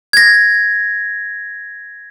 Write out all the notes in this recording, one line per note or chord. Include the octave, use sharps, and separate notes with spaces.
G#6 A#6